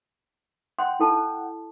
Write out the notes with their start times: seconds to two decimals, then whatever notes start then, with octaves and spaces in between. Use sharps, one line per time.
0.79 F#5 G5 C6
1.00 E4 A4 A5